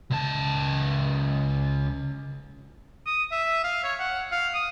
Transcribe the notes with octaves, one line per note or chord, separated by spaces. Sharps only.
C#2 A5
D#6
E5
F5
C#5
F#5
F5
D#6